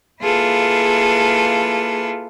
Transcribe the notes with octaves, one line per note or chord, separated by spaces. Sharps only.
A#3 E4 F4 G#4 A4 B4